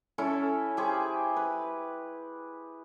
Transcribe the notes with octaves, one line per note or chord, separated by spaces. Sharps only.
C#4 E4 A4
G4 G#4 C5
B4